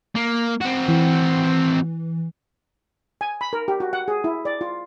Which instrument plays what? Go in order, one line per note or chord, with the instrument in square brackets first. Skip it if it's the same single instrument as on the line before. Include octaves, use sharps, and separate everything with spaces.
[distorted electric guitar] A#3
C4 F#4
[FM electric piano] E3
[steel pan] G#5
B5
A#4
G4
F#4
F#5
G#4
E4
D5
F4